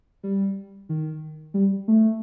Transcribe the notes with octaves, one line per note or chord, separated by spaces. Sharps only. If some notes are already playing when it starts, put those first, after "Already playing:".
G3
D#3
G3
A3